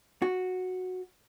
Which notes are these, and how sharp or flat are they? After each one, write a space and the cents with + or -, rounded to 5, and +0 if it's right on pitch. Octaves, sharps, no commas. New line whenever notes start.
F#4 -10